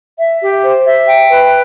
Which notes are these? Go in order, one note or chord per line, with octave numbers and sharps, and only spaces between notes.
E5
G4
C5
E5
G5
B4